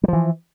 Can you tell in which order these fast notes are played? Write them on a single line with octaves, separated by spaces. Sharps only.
G3 F3 E3